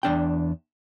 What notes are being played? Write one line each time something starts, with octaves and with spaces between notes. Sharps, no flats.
E2 D4 G5